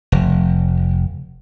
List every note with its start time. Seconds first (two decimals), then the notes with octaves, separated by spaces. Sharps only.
0.12 F1